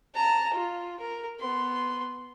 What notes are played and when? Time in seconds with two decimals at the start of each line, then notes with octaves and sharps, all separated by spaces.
0.15 A5 A#5
0.54 F4
1.00 A#4
1.40 B3 C6